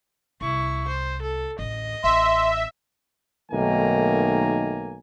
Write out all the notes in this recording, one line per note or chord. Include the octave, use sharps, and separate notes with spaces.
C2 E4 C#6
C5
A4
A1 D2 D#5
A1 E5 C6
B1 D#3 A3 A#3 G#5 A#5